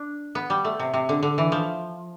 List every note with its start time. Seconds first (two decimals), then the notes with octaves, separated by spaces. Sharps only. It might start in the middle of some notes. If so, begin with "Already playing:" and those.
Already playing: D4
0.35 B3
0.50 G3
0.65 A3
0.79 C3
0.94 C3
1.09 D3
1.23 D3
1.38 E3
1.52 F3